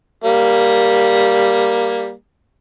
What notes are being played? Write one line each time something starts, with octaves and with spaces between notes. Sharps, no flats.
G3 A#3